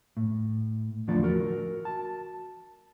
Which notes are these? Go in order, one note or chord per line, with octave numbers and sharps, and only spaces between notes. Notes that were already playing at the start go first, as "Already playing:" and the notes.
A2
E2 D3 F3 A3 D5
F#4 A#4
A5